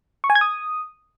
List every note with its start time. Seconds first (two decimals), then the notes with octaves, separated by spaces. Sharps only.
0.24 C#6
0.30 G#5
0.35 G#6
0.41 D#6